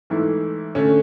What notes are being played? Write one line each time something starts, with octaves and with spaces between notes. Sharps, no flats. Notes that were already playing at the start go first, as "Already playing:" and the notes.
G#2 E3 A3 E4
D3 A3 C#4